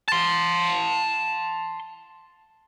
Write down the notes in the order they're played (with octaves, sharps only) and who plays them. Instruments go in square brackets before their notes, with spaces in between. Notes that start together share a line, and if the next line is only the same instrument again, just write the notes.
[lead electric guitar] A5 C6